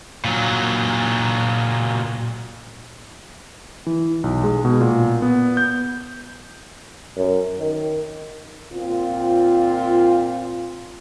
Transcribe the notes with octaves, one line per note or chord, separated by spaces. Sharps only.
A#2 F#3
E3
B1
G#3
B2
A#2
B3
G6
F#2
D#3
A#2 C4 F4